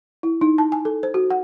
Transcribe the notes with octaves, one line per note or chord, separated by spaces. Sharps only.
E4
D#4
A5
G#5
A4
C5
F#4
F#5